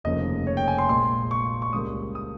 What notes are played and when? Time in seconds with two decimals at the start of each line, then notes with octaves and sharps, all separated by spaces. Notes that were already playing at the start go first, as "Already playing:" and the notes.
0.04 F1 D#2 C#3 F3 A#3 D#5
0.47 C#5
0.57 G5
0.68 G#5
0.78 C6
0.89 A#1 A#2 G#3 C6
1.31 C#6
1.62 C#6
1.73 C#2 C#3 G3 A#3 D#6
2.15 D#6